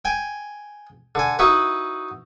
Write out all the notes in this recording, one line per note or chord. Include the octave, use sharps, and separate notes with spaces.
G5 G#5
D3 G#5
D#4 E4 F#4 B4